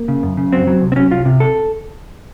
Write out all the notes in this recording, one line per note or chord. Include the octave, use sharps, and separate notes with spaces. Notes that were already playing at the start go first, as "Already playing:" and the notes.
Already playing: A#3
C#3
F#2
C#3
F#3 C4
F#3
C2
C4
F#3 C#4
C2 F4
C3
A4